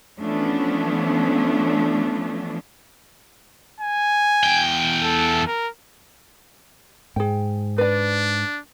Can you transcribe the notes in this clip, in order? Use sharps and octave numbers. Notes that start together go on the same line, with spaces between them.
E3 F3 A3 B3 C#4 D4
G#5
E2 G5
A4
A#4
G#2 G#4 G5
D4 B4 D5